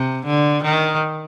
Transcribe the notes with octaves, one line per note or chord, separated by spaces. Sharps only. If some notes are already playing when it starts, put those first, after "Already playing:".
Already playing: C3
D3
D#3